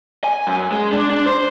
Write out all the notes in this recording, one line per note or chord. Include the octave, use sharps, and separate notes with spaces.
G#5
F#2
G#3
D4
D4
C5